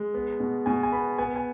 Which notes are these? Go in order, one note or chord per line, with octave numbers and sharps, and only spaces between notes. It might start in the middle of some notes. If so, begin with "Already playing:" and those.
Already playing: G#3
B3
B2
B2 G#5
G#5
B3 B5
B3 G#5
G#5